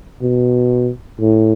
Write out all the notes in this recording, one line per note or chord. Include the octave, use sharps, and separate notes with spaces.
B2
A2